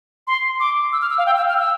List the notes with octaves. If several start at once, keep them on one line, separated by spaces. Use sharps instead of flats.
C6
D6
E6
F6
E6
F5
G5
E6
F6
E6